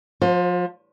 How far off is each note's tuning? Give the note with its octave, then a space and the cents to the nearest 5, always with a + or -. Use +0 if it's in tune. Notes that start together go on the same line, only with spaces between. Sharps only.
F3 +35 C5 +0